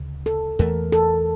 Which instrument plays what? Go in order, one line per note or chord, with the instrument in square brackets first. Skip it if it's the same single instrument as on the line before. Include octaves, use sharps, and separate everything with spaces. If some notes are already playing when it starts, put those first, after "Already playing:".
Already playing: [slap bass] D2 C#3
[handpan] A4
[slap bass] E2 E3 A3 [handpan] A#4
[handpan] A4